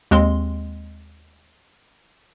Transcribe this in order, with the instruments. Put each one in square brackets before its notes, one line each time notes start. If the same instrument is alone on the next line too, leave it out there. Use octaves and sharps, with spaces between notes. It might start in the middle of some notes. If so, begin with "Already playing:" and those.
[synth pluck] D#2 G#3 C4 C6